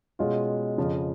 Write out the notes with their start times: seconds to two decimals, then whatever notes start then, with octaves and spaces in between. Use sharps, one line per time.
0.19 B2 G#3 C#4 F4
0.78 F2 C#3 F3